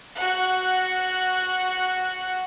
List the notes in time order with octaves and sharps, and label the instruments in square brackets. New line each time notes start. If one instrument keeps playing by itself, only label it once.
[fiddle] F#4 F#5